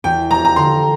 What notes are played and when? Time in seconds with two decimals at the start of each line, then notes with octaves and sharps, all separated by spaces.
0.04 E2 G5
0.30 F1 A#5
0.45 A#5
0.56 D3 C6